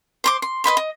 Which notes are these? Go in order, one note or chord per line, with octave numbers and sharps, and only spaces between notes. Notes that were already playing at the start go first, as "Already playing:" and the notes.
C5 C6 D6
C6
B4 D#5 B5 C6
D#5